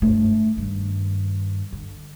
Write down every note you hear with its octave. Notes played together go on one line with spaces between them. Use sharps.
G2 A3
G2 D#3
D3